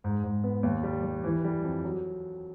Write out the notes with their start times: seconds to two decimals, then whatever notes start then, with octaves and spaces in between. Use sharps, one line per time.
0.04 G#2
0.23 G#2
0.44 B3
0.63 D#2
0.84 G3
1.03 G3
1.24 E3
1.44 G3
1.64 F2
1.84 F#3